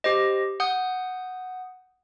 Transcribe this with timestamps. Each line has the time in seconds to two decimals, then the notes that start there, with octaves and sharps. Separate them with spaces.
0.04 G4 C5 D#5
0.60 F#5 D#6 G6